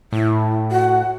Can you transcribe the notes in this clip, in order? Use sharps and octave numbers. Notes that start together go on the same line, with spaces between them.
A2 E4
F#4 F#5